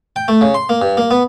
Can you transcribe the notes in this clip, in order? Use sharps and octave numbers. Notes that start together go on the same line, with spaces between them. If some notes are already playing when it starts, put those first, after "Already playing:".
G5
A3
C#3
C6
A#3
G2
A#3
B3